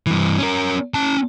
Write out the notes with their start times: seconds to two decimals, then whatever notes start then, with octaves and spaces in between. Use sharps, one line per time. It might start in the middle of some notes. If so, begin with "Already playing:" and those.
0.07 G2 E3
0.39 C#4 A#4
0.94 C#4 A5